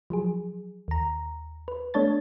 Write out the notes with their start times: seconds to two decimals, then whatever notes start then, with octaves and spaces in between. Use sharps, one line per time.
0.10 F3 F#3 G#4
0.88 D#2 A#5
1.68 B4
1.94 A3 B3 D4 C#5 A5 A6